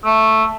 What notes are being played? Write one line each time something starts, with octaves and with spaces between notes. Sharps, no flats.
A3